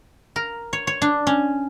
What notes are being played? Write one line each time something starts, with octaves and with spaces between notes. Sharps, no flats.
A#4
C#5
C#5
D4
C#4